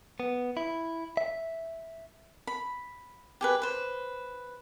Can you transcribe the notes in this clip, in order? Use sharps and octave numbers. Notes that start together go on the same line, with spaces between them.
B3
E4
E5
B5
G4 G#4 B4
B4 C5